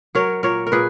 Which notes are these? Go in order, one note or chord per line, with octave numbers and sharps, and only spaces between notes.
F#3 A#4 C#5
A#2 A#4 C#5
A#4
A#2 G#4 B4